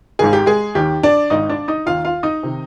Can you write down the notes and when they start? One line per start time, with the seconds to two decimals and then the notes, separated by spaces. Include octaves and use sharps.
0.19 G#1 G#2 D#3 G#4
0.33 G4
0.46 G#3 G#4
0.75 D#2 D#3 G4
1.03 D4 D5
1.30 G#1 G#2 D#3 D#4 D#5
1.49 D4 D5
1.68 D#4 D#5
1.86 D#2 D#3 F4 F5
2.05 F4 F5
2.23 D#4 D#5
2.43 C3 D#3